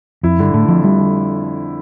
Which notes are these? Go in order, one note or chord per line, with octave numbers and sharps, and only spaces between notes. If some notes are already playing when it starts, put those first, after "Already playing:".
F2 E4
G2 D3
A2 A3
F2 F3
G3 E4
D3